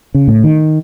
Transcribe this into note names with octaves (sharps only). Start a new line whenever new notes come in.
C#3
A2
D#3